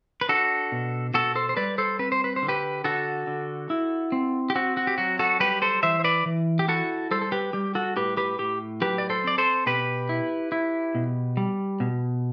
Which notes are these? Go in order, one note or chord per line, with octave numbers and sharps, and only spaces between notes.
B4
D4 F#4 A4
B2
B2 F#4 A4
A4 C5
C5
G3 B4 D5
A4 C5
C4 B4
C5
B4
C5
D3
G4 B4
D3 F#4 A4
D3
E4
C4
G4
C4 F#4
F#4
G4
F#3 F#4
F#4 A4
G3 G4 B4
A4 C5
E3 C5 E5
C5
B4 D5
E3
G4
E4 F#4 A4
G3 A4 C5
A4
G4 B4
G3 G4
F#4 A4
A2 G4 B4
G4 B4
A2 G4
F#3 G4 B4
D5
A4 C5
C4 D5
A4 C5
B2 G4 B4
E4
E4
B2
G3
B2